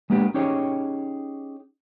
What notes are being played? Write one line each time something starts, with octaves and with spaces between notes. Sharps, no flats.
G#3 A#3 B3 D4 G4
C#4 D#4 G4 G#4 C#5